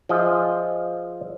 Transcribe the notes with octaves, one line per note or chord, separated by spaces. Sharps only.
F3 F4 G#4 D#5 E5